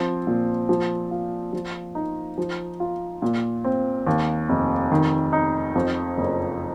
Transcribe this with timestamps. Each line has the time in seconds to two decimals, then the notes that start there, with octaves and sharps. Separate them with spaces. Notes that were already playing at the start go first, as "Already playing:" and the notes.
Already playing: F3 C4
0.27 A#2
0.69 F3
1.11 F4
1.53 F3
1.95 D#4
2.38 F3
2.80 F4
3.22 A#2
3.64 C4
4.07 D#2
4.49 F1
4.92 D#3
5.33 D#4
5.75 F2
6.18 F#1